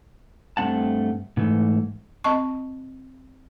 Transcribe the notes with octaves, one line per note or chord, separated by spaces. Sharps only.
G2 A3 C4 F#5 A5
G#2 E3 A3
C4 D#5 A5 C#6